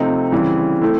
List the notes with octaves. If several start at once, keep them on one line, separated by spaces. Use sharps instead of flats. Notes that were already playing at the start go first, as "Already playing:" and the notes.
Already playing: C3 F3 A3 C4 D#4
C#3 E3 G3 C4
A3 C4 E4